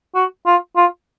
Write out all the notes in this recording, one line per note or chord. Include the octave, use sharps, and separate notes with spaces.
F#4
F4
F4